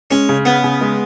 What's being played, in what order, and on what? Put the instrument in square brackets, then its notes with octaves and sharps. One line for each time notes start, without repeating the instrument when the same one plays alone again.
[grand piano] G#3 [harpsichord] C#4
[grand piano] C#3
[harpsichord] B3 [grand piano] C#4
[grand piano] C#3
G#3